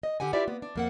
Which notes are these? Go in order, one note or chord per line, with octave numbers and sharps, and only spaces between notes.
D#5
D3 G4 F#5 G#5
E4 F4 G4 B4 D5 E5
A#3 B3
D4
F2 A#3 F#5